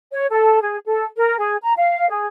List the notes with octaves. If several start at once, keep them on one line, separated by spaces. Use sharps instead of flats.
C#5
A4
G#4
A4
A#4
G#4
A#5
F5
G#4